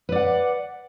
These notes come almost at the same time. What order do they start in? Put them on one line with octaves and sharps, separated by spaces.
B4 D5 F#5